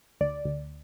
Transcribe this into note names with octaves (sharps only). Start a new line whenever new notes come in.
D2 D5
D2